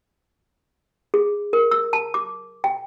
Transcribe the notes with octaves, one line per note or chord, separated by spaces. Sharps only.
G#4
A#4
E6
A5
D6
G5